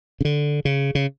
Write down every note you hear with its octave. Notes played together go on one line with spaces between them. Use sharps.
C#3
D3
C#3
C#3